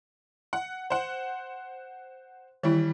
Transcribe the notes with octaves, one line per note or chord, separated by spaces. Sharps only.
F#5
C5 F#5
D#3 E3 G3 E4